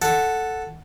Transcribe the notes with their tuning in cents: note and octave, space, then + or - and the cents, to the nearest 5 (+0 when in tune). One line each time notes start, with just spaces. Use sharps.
A4 +0 F#5 +0